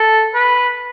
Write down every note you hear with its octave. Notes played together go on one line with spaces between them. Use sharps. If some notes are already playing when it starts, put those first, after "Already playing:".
Already playing: A4
B4